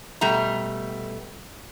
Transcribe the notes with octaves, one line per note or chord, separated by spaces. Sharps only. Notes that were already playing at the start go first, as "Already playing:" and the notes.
B2 G3 A3 A#5